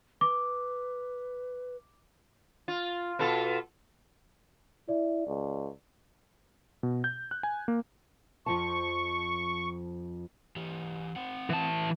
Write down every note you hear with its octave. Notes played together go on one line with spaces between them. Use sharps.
B4 D6
F4
B2 F4 A4
E4 D5
C#2
B2
G6
F#6
G#5
A#3
F2 F3 A5 C#6
E3 G4
C4 F#5
E3 A5